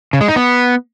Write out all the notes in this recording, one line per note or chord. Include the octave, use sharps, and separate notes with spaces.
C#3
G#3
D#4
B3